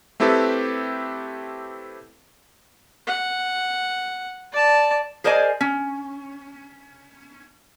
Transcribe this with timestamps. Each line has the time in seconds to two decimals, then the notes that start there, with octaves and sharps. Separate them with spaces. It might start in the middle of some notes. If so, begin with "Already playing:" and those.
0.20 A3 C4 E4 G4 A4 B4
3.07 F#5
4.52 D5 A5
5.24 G#4 A#4 C5 D5 D#5 G#5
5.61 C#4